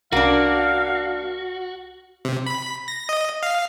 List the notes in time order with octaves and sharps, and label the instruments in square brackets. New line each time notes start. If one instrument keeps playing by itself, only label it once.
[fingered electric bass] C2 C#4 [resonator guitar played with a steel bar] A#3 D4 [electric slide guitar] F#4 [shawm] F5
[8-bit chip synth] C3
B5
A#6
D#5
F5